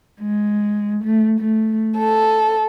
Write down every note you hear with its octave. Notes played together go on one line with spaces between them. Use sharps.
G#3
A3
A3
A4